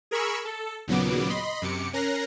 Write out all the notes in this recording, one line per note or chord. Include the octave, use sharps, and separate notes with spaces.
G#4 A#4 B5 C#6 E6
A4
D#2 A#2 C#3 F#3 B3 D6
D#5 B5 C6
F#2 C3 D6 C#7
C#4 A#4 A#5 F#6 A#6 C7